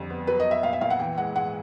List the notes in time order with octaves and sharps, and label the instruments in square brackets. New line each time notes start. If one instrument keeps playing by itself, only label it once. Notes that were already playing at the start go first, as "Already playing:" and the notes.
Already playing: [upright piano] F2 D3 G3
B3
[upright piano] F#3 [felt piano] B4
[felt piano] D#5
[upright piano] B3
[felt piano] E5
[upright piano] A#2 [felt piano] F5
[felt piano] E5
[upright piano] A#2 [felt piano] F5
[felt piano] F#5
[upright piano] E3 [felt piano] G5
[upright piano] G#3 [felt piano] F#5
[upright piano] G#2 [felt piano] F#5